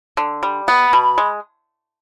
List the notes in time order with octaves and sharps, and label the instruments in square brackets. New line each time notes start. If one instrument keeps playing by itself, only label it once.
[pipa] D3
G3
[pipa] B3 [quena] B5
[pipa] B2
G#3